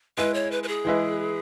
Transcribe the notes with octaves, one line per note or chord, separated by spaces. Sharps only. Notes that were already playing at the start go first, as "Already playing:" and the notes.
G#3 E4 G#4 B4
C#5
B4
B4
G#4
E3 G#3 E4 B4